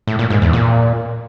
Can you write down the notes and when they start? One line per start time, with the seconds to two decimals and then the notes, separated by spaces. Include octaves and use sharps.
0.07 A2
0.19 A#2
0.30 G#2
0.42 E2
0.53 A#2